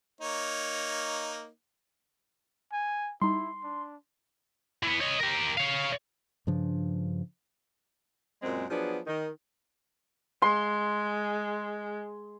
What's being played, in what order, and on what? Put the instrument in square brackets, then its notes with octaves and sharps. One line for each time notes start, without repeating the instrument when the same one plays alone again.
[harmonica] A#3 D#4 C#5
[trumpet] G#5
[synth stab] G3 D#4 [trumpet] E4 [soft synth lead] C6
[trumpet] D4
[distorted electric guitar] E3 B3
C#5 D#5
G4 A#4
C#5 F5
[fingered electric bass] G2 C#3 F3 D4
[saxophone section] F#2 A#2 G#3 C4
F3 F#3 B3 D4 G#4
D#3
[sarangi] G#3 [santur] C6